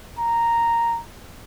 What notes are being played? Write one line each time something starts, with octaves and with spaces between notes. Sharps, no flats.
A#5